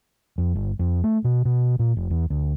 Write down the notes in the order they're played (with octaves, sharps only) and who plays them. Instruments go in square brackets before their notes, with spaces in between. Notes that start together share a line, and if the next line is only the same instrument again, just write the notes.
[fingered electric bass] F2
G1
F2
A3
B2
B2
A#2
F1
E2
D2